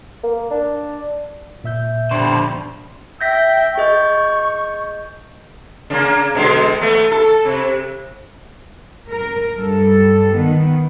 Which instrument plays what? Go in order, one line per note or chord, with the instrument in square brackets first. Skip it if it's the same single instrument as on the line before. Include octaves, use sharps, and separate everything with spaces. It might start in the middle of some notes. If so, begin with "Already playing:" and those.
[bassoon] A#3
D4
[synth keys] A#2 E5 G6
[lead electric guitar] F2 B2 [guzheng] D3 G3 [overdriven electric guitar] C5
[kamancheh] E5 G5 [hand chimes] G6 A#6 B6
[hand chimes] G#4 D#5 G6 [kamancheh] C#6
[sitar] C#3 A#3
B2 D3 G#3
A3 B3
A4
C3
[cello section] A#4
G2 A4
D#3 B3